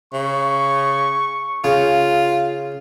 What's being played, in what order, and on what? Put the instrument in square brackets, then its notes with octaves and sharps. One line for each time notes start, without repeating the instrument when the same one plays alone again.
[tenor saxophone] C#3 [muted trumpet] C#6
[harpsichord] C#3 [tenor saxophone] F4